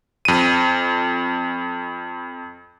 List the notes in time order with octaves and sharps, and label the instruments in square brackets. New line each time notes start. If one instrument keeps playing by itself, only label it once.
[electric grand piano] F2 D#7